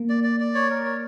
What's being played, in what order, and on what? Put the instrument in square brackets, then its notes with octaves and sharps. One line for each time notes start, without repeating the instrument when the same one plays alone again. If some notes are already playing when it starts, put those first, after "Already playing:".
Already playing: [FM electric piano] A#3
[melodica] D5
D5
D5
C#5
A#4
C#5